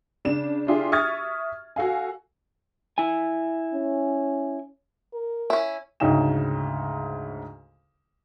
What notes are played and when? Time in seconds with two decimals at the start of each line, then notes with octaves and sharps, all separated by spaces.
0.25 C#3 D4 E7
0.67 D4 E4 F4 G4 G#4
0.92 E5 C#6 D#6 F6 G#6 A6
1.76 F#4 A4 F5 G#5
2.98 E4 G#5
3.74 C#4
5.14 A#4
5.50 C#4 E4
6.00 D2 G#2 C#3 D#4 G5 E7